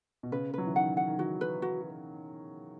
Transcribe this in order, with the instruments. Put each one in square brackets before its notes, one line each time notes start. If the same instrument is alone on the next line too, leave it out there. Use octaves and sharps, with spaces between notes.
[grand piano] B2
[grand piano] C#3 [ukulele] B4
[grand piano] F#3 [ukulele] B4
[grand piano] E3
[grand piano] D#3 [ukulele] F#5
[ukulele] F#5
[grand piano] D#3
[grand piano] E3 [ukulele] F#4
[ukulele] B4
F#4